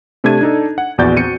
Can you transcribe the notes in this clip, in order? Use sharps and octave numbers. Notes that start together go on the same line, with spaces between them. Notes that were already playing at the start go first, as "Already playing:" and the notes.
C3 A3 D4 A5 G#6 D#7
D4 D#4 A4
F#5
A#1 E2 F#4 D5 G6 A6
C4 F#4 C#7 D#7